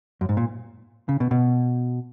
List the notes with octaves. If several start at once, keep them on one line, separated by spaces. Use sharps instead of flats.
F#2
G#2
A#2
C#3
B2
B2